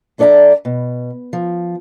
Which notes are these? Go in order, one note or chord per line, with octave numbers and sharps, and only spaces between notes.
F#2 D4 A4 D5 E5 A#5
B2
F3